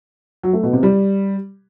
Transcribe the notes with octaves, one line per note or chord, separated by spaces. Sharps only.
F#3
A3
B2
C3
G3